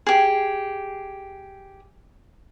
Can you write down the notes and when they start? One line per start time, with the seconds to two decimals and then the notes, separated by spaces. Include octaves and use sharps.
0.07 G4 G#4